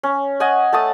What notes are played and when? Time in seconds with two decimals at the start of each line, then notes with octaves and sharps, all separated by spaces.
0.03 C#4
0.40 D#5 F#5 G#5
0.73 A3 A5 D#6